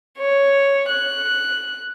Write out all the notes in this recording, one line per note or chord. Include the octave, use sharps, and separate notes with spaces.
C#5
F#6